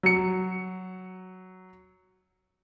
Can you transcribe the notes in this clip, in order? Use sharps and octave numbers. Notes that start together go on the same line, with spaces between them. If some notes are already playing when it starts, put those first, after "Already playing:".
F#3 C#7